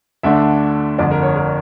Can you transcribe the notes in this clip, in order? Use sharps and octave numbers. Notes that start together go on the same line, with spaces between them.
D2 D3 A3 D4 E5
G1 F2 D3 D5
A#4
C#5
A#4